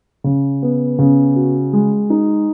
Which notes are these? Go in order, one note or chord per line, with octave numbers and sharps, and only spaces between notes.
C#3
B3
C#3
F#4
G#3
D#4